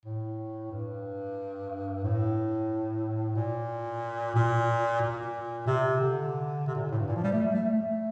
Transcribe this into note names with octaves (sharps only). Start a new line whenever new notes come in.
A2
G2
A2
A#2
A#2
A#2
C3
D3
C3
A#2
A2
G2
A#2
F3
G3
A3
A3
A3